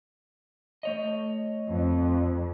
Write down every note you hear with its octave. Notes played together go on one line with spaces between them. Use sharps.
A3 C#5 D#5
F2